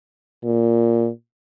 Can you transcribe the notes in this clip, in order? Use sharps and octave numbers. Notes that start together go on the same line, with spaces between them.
A#2